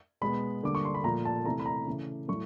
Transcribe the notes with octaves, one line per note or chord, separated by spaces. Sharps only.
B2 G#3 B3 B5
D3 G3 A#3 D6
C#6
C6
B5
A#2 F3 A3 A#5
A5
C3 E3 A3 A#5
B5
A#5
C#3 E3 A3
A2 F#3 A3 C#6